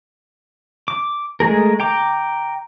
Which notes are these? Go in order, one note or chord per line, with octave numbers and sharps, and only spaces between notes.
D6
G#3 A3 G#4 A#4
G5 A#5 D6